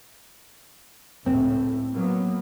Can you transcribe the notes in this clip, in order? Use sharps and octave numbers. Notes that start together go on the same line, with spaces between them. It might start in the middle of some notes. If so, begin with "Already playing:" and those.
C#2 A2 C4
F#3 A#3 B3